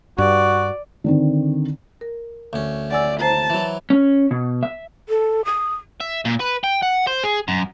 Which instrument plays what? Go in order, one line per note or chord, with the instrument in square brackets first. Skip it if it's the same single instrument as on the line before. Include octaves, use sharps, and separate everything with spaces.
[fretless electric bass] G2 [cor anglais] F#4 [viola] D5
[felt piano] D3 D#3 C4
[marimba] A#4
[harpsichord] D2 C#4
[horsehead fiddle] D5 [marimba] F#5 G#5 E6
[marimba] C5 A#5 [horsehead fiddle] A5
[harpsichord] E3 F#3
[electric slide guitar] C#4
B2
E5
[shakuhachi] A4
D#6
[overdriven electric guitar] E5
A#2
B4
G5
F#5
C5
G#4
F#2